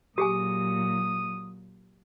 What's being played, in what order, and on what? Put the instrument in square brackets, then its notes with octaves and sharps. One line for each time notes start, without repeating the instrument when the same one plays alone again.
[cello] A#2 F#3 [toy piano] G4 G#4 G#5 [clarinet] D#6